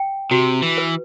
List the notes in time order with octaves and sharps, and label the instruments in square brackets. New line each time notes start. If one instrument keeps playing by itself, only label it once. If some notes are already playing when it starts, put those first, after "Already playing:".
Already playing: [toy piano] G5
[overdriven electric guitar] C3 [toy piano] F#4
[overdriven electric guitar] E3
[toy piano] B4